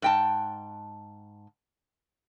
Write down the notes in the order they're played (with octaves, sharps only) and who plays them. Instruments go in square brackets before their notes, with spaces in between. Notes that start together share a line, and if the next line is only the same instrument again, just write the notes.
[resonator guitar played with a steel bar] G#2 G5 A5